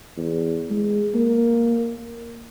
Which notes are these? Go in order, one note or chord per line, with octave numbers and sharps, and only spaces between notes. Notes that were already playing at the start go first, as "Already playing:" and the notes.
E2
G#3
A#3